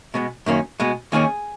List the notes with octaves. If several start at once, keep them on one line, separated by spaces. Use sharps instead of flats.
B2 G#3 B3
F#2 D#3 A#3 C#4
B2 G#3 B3
D#2 D#3 A#3 C#4 G#4